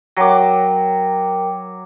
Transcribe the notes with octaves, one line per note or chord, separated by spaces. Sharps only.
F#3 A#4 G5 D6